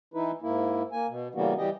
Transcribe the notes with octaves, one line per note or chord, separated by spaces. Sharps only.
E3 D#4 E4 B4
G#2 A#3 E4
A#3 G#5
B2
C#3 E3 G3 A#3 B3 F#4
E3 G3 G4 D#5